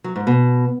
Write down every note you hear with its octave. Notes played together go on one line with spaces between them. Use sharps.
F#3
G#2
B2